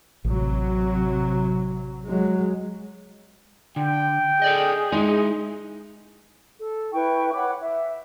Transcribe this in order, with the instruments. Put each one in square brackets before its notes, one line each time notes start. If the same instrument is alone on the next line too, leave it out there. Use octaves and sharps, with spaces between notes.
[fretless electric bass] A1 [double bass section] C3 F#3
[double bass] F#3 G#3
[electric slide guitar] D3 [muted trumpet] G5
[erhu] G#4 [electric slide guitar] A4 D5 D#5
[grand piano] G#3 [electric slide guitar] D#4 E4
[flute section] A4
E4 B4 G5 C#6
C#5 F#5 B5 D6
E5